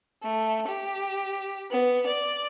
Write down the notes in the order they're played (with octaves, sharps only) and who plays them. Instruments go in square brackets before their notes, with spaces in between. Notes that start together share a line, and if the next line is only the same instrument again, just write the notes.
[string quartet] A3
G4
B3
D5